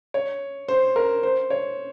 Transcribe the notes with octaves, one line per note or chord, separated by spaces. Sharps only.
C#5
C5
A#4
C5
C#5